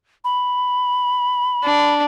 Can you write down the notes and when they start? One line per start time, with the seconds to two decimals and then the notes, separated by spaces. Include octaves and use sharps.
0.24 B5
1.64 D4